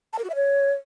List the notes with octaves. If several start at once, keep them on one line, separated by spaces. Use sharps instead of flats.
A5
A#4
F#4
E5
C#5